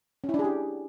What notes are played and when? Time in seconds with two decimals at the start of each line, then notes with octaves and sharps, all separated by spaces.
0.24 C#4
0.29 E4
0.34 D4
0.39 G#4
0.44 G4